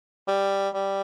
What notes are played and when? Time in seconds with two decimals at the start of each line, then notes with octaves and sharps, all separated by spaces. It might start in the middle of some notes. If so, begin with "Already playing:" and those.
0.28 G3
0.74 G3